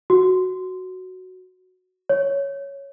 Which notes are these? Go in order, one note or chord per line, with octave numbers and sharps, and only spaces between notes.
F#4
C#5